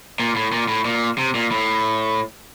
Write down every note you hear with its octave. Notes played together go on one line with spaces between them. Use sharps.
A#2
A2
A#2
A2
A#2
C3
A#2
A2